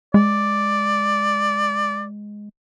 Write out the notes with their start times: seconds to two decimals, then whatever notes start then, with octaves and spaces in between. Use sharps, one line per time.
0.14 G#3 D5